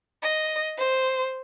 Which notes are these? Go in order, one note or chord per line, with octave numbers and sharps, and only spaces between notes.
D#5
C5